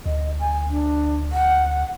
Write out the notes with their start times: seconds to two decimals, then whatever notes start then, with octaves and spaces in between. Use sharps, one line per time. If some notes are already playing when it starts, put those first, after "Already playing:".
0.06 D2 D#5
0.40 G#5
0.70 D4
1.32 F#5